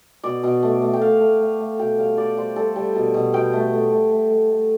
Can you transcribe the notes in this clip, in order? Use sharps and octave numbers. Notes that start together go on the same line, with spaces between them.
B2 D5
B2
A3
A3
G5
A3 F5
A3
A3
A3
B2 G5
G3 F5
G3 D5
G3 C5
G3 A4
G3
B2
B2
B2 G5
A3
A3
A3
A3
A3
A3